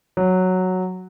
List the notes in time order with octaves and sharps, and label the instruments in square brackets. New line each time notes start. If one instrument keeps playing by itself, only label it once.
[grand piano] F#3